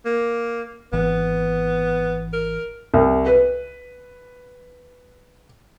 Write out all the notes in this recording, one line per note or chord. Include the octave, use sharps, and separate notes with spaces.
A#3
G#1 E3 B3
A#4
C2
B4